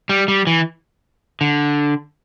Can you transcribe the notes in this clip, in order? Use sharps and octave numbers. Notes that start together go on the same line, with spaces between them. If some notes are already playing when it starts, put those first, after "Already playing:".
G3
G3
E3
D3